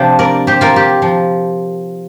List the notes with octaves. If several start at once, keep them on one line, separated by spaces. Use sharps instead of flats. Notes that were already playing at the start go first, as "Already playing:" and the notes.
Already playing: C3 F3 D4 C5 F5 G5
A#4 D5
G4 C5
F4 A#4
G4
F3